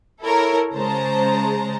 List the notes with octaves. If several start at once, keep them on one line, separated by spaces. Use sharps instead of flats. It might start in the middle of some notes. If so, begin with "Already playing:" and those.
E4 A4 A#4 C#5
C#3 G#3 C5 A5 A#5